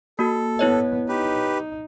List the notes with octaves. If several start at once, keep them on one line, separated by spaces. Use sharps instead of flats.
A#3 F#4 A4
B3 E4 C#5 D#5
D#4 G4 B4